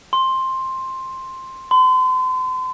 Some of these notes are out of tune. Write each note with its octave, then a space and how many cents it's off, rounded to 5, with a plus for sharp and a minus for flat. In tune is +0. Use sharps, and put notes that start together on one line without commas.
C6 +10
C6 -40